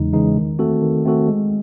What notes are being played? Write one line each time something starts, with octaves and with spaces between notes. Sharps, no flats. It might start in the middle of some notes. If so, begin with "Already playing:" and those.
Already playing: E2 C#3 E3 G#3 D#4
C#3 E3 G#3 D#4
D#3
A3 C4 F#4 A4
D#3
A3 C4 F#4 A4
G#3